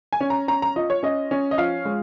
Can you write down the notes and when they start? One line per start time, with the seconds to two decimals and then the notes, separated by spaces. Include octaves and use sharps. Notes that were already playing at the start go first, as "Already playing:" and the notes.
0.13 G#5
0.20 C#4
0.30 A#5
0.48 C#4 A#5
0.62 A#5
0.76 F4 D#5
0.90 C#5
1.03 C#4 D#5
1.31 C#4
1.51 D#5
1.58 F3 F5
1.85 G#3